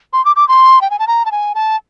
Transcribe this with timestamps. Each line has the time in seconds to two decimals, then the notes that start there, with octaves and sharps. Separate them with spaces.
0.13 C6
0.25 D6
0.36 D6
0.48 C6
0.81 G5
0.91 G#5
0.99 A5
1.07 A#5
1.26 A5
1.32 G#5
1.55 A5